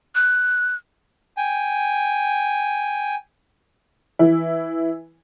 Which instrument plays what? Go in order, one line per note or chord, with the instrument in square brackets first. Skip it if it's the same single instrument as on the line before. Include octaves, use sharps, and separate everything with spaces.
[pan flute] F#6
[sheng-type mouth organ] G5 G#5
[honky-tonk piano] E3 E4